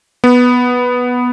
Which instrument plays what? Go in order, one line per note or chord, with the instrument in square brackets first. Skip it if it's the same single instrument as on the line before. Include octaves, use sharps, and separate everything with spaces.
[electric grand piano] B3